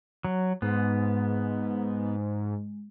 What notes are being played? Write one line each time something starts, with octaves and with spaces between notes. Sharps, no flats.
F#3
G#2 G#3 B3